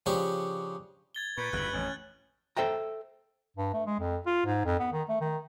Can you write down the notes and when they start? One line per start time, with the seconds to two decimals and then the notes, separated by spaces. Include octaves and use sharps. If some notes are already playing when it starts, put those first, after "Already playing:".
0.06 C#3 F3 D4 G4 C#6
1.15 G#6 A6 G7
1.38 A#2 B4 B5 C#6 G6 G#6
1.53 G1 E2 C#3 F#6 F#7
1.72 A1 F2 C#4
2.57 A4 C5 E5 G5 A#5
3.57 G2
3.74 A3
3.86 G#3
4.00 F2
4.26 F4
4.46 G#2
4.65 F2
4.79 B3
4.92 D#3
5.09 A3
5.21 D#3